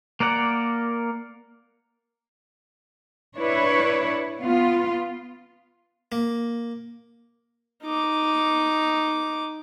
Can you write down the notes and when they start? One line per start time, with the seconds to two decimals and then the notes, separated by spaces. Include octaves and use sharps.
0.20 A#3 A#4 D5 F#5
3.39 D4 E4 B4 C#5
4.43 B3 F4
6.12 A#3
7.84 D#4 D6